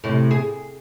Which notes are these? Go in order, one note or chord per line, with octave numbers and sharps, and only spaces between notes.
A2 C3
G#4